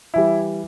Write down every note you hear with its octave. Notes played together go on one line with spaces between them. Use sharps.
E3 G3 E4